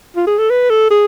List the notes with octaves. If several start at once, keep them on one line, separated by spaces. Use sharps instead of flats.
F4
G#4
A4
B4
A4
G#4